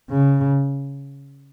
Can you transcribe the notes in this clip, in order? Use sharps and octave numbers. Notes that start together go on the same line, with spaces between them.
C#3